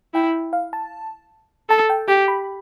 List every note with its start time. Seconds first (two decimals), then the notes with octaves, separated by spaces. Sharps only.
0.14 E4 G5
0.53 F5
0.73 A5
1.69 A4 A5
1.90 G5
2.08 G4 G5
2.28 B5